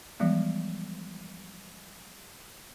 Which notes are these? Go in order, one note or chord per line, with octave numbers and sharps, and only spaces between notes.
E3 F3 G3 G#3 B3